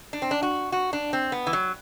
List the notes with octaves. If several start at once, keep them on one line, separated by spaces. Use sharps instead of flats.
D4
C4
D4
F#4
F#4
D4
C4
B3
E3
F#3